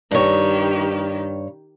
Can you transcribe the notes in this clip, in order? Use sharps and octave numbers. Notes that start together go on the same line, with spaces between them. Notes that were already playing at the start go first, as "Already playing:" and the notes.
G2 D#3 G4 C#5